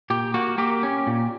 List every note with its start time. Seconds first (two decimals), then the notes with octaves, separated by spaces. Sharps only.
0.10 A#2 G4
0.34 A#3 F#4
0.58 A#3 G4
0.83 C#4
1.07 A#2